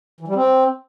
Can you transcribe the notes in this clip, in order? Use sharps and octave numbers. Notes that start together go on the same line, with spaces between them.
E3
G3
C4